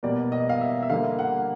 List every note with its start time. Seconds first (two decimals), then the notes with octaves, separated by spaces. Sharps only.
0.03 B2 G3 A#3 D5
0.32 D#5
0.49 F5
0.61 E5
0.83 E5
0.90 D3 G3 A#3 F5
1.19 F#5